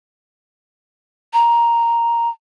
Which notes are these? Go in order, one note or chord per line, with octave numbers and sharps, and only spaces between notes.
A#5